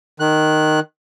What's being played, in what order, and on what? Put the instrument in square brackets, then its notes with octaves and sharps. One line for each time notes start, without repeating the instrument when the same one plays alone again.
[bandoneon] D#3 F#6